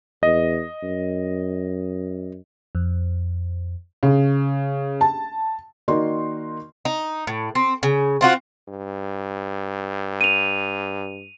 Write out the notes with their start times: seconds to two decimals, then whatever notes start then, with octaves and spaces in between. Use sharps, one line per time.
0.23 E2 D#5
0.83 F#2
2.75 F2
4.03 C#3
5.01 A5
5.88 D#3 A#3 D#4 F#4 D5 C6
6.85 D#4
7.27 A2
7.55 C4
7.83 C#3
8.21 C4 F4 F#4
8.68 G2
10.21 D#7 F7